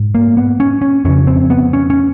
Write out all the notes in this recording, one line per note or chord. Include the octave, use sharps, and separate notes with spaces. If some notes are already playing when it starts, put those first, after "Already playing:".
Already playing: G#2
A#3
B3
C#4
C#4
F2 C#3 C#4
C4
B3
C#4
C#4